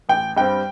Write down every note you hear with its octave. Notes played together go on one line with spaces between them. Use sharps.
A1 G5
G2 G3 C4 G5